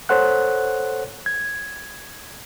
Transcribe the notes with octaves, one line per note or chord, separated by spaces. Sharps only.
A4 C5 C#5 F#5 F#6
G#6